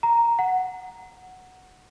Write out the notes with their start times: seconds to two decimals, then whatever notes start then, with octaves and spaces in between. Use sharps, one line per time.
0.03 A#5
0.39 F#5